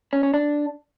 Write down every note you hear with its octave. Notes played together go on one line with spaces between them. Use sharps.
C#4
C#4
D4